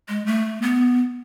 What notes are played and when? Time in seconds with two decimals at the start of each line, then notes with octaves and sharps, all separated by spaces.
0.09 G#3
0.26 A3
0.62 B3